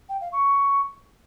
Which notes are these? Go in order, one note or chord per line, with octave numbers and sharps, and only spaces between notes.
G5
F5
C#6